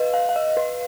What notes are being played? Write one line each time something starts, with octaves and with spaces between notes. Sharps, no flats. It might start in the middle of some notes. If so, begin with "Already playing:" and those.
Already playing: B4 D#5 F5
F5
F5
D#5
B4